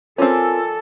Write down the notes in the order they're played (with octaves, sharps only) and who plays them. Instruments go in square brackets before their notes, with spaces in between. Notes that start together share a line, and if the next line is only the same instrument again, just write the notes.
[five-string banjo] C4 C#4 [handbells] F4 A#4 [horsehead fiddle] A4 [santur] D5 G#5 E6